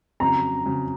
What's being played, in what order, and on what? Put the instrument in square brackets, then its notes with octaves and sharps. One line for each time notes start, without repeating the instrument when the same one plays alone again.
[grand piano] F2 C#3 F#3 [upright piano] A#5
[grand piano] F2 C#3 F#3